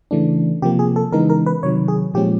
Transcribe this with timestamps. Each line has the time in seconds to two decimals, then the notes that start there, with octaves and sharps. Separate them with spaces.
0.11 C#3 E3 A3 D4
0.62 C3 F3 A#3 G4
0.79 G#4
0.96 A4
1.12 C#3 E3 G#3 B3 D#4 A#4
1.30 A#4
1.46 B4
1.63 C3 D#3 F#3 C#5
1.88 G#4
2.14 A#2 F3 G#3 C#4 G4